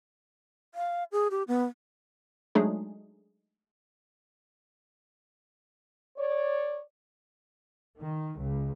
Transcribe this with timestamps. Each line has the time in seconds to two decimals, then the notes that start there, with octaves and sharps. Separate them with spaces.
0.74 F5
1.12 G#4
1.31 G4
1.48 B3
2.55 F#3 G#3 A3 D4 D#4 G#4
6.17 C#5 D5
7.99 D#3
8.38 C#2